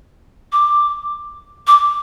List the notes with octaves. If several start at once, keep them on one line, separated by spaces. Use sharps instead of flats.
D6
D6